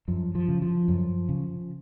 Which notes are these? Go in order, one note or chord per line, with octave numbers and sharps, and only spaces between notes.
F#2 F3
F3
C#3
F3
F#2
C#3